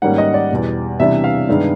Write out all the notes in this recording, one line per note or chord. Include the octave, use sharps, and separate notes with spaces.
G#2 D#3 G3 A#3 C#4 F#5
D#5
D5
E2 B2 G3
C3 E3 G3 B3 D4 E5
F5
G2 D#3 G#3 B3 D4